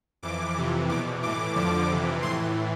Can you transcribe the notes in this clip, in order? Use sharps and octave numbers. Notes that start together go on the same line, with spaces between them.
F2 E3 D6
F2 C3 E3
E2 B2 D6
A2 E3 D6
F2 D3 F3 D6
F2 C3 E3
A2 E3 C6